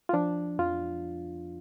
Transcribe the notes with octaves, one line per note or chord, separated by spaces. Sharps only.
F4
F3 D4
F2 F4